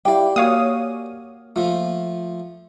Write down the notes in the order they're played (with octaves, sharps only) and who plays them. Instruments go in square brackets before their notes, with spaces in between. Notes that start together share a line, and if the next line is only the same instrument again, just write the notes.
[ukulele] E4 F5 G5 [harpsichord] G4 D5
[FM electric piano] A#3 [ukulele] F#4 G#5 [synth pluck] C#5 F5 D#6
[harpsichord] F3 A3 [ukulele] F4